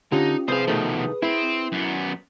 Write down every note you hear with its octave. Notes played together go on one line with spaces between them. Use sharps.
D3 C#4 D#4 F4 G4
C2 C4 G#4 B4 C5 F5 D#6
C2 B2 D#3 F3 A3
C4 E4
F#2 B3